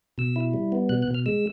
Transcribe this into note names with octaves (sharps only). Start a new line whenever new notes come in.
B2 E6
E4
G3
B3
B2 F#6
F#6
B2
F6
G#3 E6